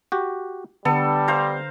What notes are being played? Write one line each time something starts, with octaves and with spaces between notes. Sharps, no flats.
F#4 G4
D3 G3 B3 A4 B4
C5 F5 A#5